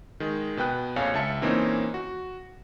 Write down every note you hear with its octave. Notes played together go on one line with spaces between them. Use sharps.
D#3 G#3
B2 B3 G5 F#6
A#1 F2 C#5 F5 G#5
C#2 E5 A5 C#7
A#2 E3 A#3 C4 C#4 D#4
F#4